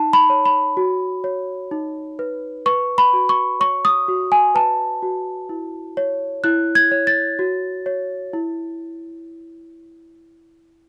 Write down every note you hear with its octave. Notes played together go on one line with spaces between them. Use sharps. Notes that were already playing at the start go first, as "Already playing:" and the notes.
Already playing: D#4 A5
B5
C#5
B5
F#4
C#5
D#4
B4
B4 C#6
B5
F#4
C#6
C#5 C#6
D#6
F#4
G#5
B4 A5
F#4
E4
C#5
E4 F#6
G#6
C#5
A6
F#4
C#5
E4